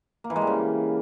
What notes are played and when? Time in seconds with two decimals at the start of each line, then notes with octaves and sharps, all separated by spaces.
0.24 A#3
0.30 E3
0.36 G#3
0.41 G3
0.47 C#3